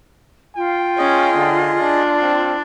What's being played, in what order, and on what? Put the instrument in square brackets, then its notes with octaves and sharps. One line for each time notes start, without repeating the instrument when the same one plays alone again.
[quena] F4 [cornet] G5
[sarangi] C#4 [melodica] G#4 D#5
[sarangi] D3
D4
[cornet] C4